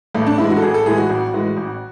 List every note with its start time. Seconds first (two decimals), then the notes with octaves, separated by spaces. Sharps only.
0.15 A1 A3
0.27 D4
0.38 A2 E3 G#3 E4
0.50 F#4
0.57 A4
0.62 A1 G#4
0.74 A4
0.86 A2 E3 G#3 G#4
0.97 F#4
1.10 A1
1.33 A2 E3 G#3
1.57 A1